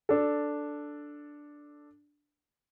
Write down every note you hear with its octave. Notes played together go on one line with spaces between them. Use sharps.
D4 A4